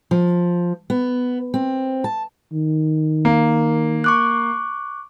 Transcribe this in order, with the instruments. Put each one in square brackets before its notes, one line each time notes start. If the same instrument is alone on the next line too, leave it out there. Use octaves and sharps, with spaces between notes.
[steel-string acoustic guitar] F3
B3
C4
A5
[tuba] D#3
[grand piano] A#3
[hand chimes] C#6 D6 F#6